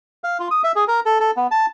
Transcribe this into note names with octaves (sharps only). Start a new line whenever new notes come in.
F5
F4
D#6
E5
G#4
A#4
A4
A4
B3
A5